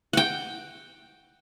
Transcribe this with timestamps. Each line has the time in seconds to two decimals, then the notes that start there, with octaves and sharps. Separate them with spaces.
0.13 F#5 G5